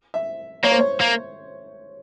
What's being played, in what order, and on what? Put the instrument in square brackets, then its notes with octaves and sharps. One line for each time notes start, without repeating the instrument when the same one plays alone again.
[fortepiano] E5
[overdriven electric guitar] A#3 [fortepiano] C#5
[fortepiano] C5
C#5
[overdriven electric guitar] A#3